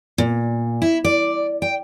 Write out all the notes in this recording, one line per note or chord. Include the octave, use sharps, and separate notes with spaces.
A#2
E4
D5
G5